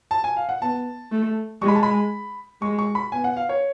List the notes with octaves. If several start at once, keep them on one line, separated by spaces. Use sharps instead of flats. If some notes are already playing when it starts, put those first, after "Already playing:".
A5
G#5
F5
F#5
B3 A5
A3
G#3 C#6
B5
A5
B5
G#3 C#6
C#6
B5
B3 G#5
F#5
F5
C#5